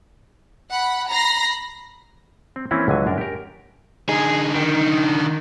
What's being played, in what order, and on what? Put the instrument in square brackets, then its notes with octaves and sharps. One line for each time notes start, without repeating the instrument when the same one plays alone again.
[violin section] F#5 B5
A#5 B5 A#6 C7
[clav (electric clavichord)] C4
E3 A#3 C4 C#4 E4
C#2 D3 F#3 G#5
F#2 D4 A#4
G4 A#4
[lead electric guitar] D3 D#4 [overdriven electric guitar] G#4
[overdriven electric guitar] D#3